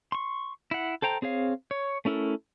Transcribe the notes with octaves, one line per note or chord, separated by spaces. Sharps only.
C6 C#6
E4 F#5
A4 C5 G5 A#5
C4 G#4 C#5 F5
C#5
A3 C#4 E4 A4 A#4